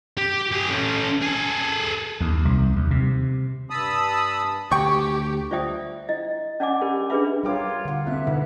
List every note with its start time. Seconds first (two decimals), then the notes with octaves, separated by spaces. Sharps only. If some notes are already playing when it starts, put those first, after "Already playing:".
0.18 G4
0.52 G#4 G5
0.69 A3 C#4
1.22 G#4 A4
2.21 D#2
2.45 C2
2.76 D#2
2.91 C3
3.70 G2 A5 B5 D#6 E6
4.72 D2 G4 G5 C#6
5.51 F4 C5 D5 E5 G5 D#6
6.09 E4 D#5
6.60 C#4 D5 F#5 G#5 D6
6.81 C#4 G4 A#4 B5
7.10 D4 G4 G#4 B4 E5 B5
7.43 G3 F4 G#4 A#4 C#5 G5 D6
7.85 D3 F#5
8.05 C2 B3 F4 A4 E5 F#6
8.27 D2 D#4 B4